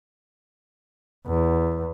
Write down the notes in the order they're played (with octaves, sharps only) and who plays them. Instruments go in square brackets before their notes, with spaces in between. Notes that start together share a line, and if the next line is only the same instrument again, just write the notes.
[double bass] E2